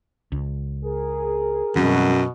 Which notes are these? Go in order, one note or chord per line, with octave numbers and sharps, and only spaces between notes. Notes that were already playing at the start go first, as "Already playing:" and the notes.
C#2
G#4 A#4
F#2 B2 E3 G3 C4